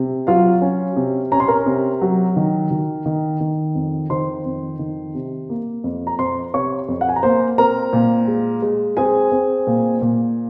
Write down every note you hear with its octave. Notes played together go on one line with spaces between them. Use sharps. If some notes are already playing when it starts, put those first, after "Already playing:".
Already playing: C3
F#3 F4 F5
C#4
C3
C#4 A#5
C6
A#4 A#5
C3
F#3
D#3
D#3
D#3
D#3
F2
D#3 C5 C6
F2
D#3
C3
A#3
F2
A#5
F2 C5 C6
C3 C#5 C#6
F2
F#5
G#5
A#5
A#3 C5 C6
C4 A#4 A#5
A#2
G#3
G#3
C4 G#4 G#5
C4
A#2
A#2